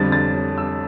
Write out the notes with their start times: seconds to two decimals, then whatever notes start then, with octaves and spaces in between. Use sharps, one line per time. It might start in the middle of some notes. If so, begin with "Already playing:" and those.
Already playing: F2 D3 G3 A6
0.12 A6
0.58 E6